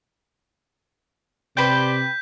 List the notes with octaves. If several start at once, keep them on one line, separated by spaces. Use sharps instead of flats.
C3 G4 B4 C5 D5 G5 G6 B6